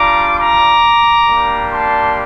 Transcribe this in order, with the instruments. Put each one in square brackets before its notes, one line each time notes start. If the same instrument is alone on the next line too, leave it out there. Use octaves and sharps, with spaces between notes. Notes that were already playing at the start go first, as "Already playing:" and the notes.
Already playing: [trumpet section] G3 D4 F4 A#5 D6
A#5 D6
G3 A#3 D4 G4
A5 C6